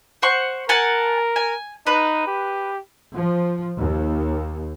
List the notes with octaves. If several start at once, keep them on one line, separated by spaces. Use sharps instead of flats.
C5 F#5 C#6
A#4 F#5 G#5 A5
G#5
D#4 B4
G4
F3
D#2